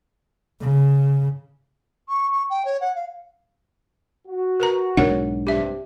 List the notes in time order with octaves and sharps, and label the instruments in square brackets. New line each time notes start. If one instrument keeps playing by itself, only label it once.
[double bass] C#3
[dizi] C#6
C#6
G5
C#5
F#5
F5
[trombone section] F#4
[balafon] A#4 B4 A#5
[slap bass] B1 G#2 D4 [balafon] A#4 C#5 F#5
[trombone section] G2 C3 [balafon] G4 E5